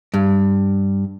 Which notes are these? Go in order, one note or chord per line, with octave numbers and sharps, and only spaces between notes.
G2